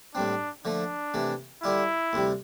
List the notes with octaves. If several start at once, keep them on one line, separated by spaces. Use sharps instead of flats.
A2 G3 C4 D4
D3 F3 A3 D4
C3 E3 A3
D3 G3 D4 E4 F4
D2 C3 G3